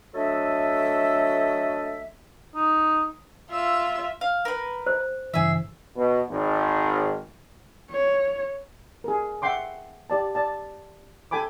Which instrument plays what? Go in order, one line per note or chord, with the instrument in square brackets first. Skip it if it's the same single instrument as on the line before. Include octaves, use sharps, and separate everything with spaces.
[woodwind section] F#3 A3 D4 A4 D#5 E5
[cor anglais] D#4
[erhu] F4 [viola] E5 [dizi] E6
[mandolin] F5
A#4 B4
[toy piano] C5
[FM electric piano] G2 C#3 E3 [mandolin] G#4 E5
[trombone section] B2
G#1
[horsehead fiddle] C#5
[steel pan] G#4 A#4
E5 F#5 G5 C6 D6
G4 D5 A5
D5 A5
A4 G5 G#5 B5 D6